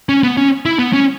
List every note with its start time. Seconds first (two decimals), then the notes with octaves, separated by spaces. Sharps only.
0.09 C#4
0.23 B3
0.37 C#4
0.65 E4
0.79 B3
0.93 C#4